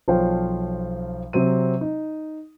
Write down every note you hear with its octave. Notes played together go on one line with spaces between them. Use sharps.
B1 F3 C5 C#5 F5 G5
C3 F#3 C4 D#7
D#4